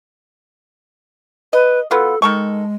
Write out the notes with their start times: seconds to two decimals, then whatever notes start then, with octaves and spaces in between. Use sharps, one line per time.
1.53 B4 D#5
1.91 F#3 B3 F4 A4
2.22 D#3 G#3 A4 C#6